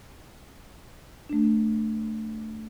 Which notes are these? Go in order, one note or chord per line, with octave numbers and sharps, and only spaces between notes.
A3 D4